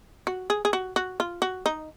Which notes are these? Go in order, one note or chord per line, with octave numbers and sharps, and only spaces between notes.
F#4
G#4
G#4
F#4
F#4
F4
F#4
D#4